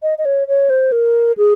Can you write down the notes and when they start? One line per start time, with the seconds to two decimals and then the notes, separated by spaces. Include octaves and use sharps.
0.02 D#5
0.18 D#5
0.25 C#5
0.48 C#5
0.70 C5
0.92 A#4
1.37 G#4